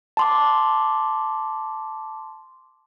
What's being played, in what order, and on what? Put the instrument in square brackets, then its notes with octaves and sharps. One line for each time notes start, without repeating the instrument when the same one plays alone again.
[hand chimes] A5 C6 D6